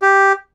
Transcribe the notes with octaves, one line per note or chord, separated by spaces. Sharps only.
G4